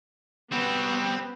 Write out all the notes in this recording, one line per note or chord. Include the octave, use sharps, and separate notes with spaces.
G3 B3 C4 F#4